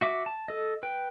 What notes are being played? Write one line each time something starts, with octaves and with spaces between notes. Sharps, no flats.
F#4 E5 D6
A5
A4 D#5
B4 G5